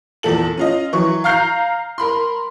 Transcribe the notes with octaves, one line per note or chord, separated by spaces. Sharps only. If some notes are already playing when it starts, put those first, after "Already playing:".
E2 A#2 A4 F#7
C#4 F4 D#5
E3 F#3 C#6
F5 A#5 F6 G6 C7
A#4 B5 C6